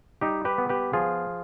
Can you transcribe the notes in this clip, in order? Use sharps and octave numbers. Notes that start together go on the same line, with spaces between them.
G3 D#4 G4
G4 B4
B3
G4 B4
F3 F4 G#4